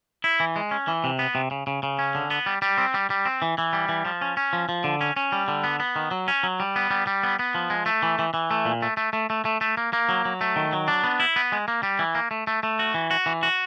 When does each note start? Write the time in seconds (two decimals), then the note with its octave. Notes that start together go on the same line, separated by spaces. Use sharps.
0.24 E4
0.40 E3
0.56 G#3
0.71 C#4
0.88 E3
1.04 C3
1.19 B3
1.35 C3
1.51 C#3
1.67 C#3
1.83 C#3
1.99 C#4
2.15 D3
2.31 B3
2.46 G3
2.62 G3
2.78 C4
2.94 G3
3.10 G3
3.26 C4
3.42 E3
3.58 E3
3.73 G3
3.89 E3
4.05 F3
4.22 C#4
4.37 C#4
4.53 F3
4.69 F3
4.84 D3
5.01 C#4
5.16 C#4
5.32 G3
5.48 D3
5.64 B3
5.80 B3
5.96 D#3
6.11 F#3
6.28 C#4
6.43 F#3
6.60 G3
6.76 B3
6.91 G3
7.07 G3
7.23 B3
7.39 B3
7.55 F3
7.70 G#3
7.86 A3
8.03 E3
8.19 E3
8.34 E3
8.51 A3
8.65 A#2
8.82 A3
8.97 A3
9.13 A3
9.30 A3
9.45 A3
9.61 A3
9.77 A#3
9.93 A#3
10.09 F#3
10.25 F#3
10.41 A3
10.56 D#3
10.73 F#3
10.88 D4
11.04 B3
11.20 E4
11.36 B3
11.52 G#3
11.68 A#3
11.83 G3
11.99 E3
12.15 A#3
12.31 A3
12.47 A3
12.63 A3
12.79 F#4
12.94 E3
13.11 F#4
13.26 E3
13.43 F#4